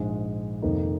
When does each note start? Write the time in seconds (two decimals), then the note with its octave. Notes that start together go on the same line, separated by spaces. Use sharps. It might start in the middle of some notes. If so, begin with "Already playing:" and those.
Already playing: A#1 G#2 G#3
0.62 F1 F2 D#3 A#3 D#4